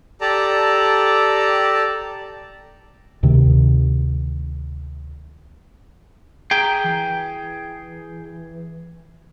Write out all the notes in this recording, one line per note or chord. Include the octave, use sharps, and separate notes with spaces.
G4 A4 D5 A5 A#5
D2 C3 D#3
G#4 G5 A#5
E3